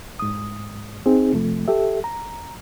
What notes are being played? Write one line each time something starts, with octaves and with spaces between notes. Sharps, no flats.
G#2 D#6
C4 D#4 G#4
F2 C3 F3 A3
G4 A4 E5
A#5